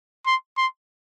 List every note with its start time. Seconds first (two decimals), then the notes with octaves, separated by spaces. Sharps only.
0.26 C6
0.57 C6